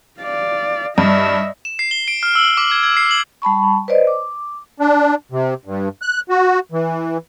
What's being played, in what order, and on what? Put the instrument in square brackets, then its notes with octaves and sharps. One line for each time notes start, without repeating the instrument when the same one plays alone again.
[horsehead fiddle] D5 F5
[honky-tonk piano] G2 [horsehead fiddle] D#5 E5
[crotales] E7
C7
G7
D7
F6
E6
D6
G#6
G#6
C7
F#7
[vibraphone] G3 A5 B5 C#6
B4 C5 D5 D#5
D6
[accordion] D4
C3
G2
F#6
F#4
E3